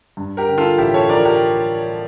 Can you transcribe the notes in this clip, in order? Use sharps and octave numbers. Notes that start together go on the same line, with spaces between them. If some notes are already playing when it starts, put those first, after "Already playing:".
G2
G4 A#4
D3
F4 A4
A1 E4 G4
A4 C#5
F3 A#4 D5
G4 A#4